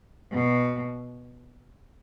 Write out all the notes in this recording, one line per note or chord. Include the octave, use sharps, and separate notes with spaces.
B2